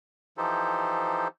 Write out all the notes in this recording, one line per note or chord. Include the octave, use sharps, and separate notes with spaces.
E3 F3 D#4 G4 A4 C5